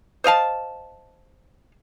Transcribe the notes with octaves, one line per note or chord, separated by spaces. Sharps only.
C5 D#5 F5 A5